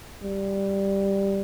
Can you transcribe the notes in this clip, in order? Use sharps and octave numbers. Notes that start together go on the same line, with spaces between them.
G3